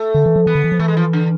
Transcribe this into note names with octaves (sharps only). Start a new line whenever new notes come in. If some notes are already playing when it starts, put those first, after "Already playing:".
Already playing: A3
D3
E3
F3
E3 B3
D3
E3
F3
E3 A3
G#3
F3
D3